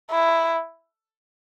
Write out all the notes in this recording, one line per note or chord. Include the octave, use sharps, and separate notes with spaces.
E4